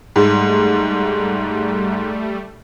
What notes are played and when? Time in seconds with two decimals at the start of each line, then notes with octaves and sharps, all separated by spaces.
0.16 G#2 G3 A3